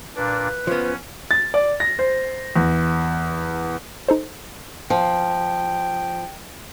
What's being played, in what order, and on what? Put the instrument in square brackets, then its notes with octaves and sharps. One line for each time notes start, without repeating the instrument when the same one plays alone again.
[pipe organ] A#2 D4 [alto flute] B4
[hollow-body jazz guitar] F3 B3 [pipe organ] C#4
[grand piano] A6
D5
A#6
C5
E2
[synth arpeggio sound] D#4 A4 C5
[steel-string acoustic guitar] F3 [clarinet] G5